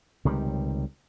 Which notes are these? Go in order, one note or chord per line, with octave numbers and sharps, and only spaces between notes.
C#2 C3 D#3 G3